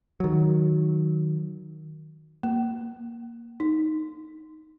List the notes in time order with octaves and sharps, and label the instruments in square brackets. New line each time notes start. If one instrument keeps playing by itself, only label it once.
[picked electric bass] D#3 F#3
[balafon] A#3
D#4